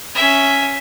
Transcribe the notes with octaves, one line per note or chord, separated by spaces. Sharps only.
C#4 E5